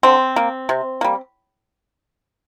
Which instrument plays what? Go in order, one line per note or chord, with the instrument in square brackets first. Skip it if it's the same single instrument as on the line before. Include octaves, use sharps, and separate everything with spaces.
[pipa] D3 C4
A#3
C3
G3 A#3